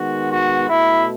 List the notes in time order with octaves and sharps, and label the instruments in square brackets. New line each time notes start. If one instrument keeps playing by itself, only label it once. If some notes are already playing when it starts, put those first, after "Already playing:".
Already playing: [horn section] D#3 G#3 B3 F#4
F#4
B2 A3 E4